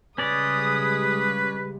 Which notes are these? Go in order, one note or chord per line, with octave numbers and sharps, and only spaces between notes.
C#3 G3 G#3 C#4 B4 D5 D#6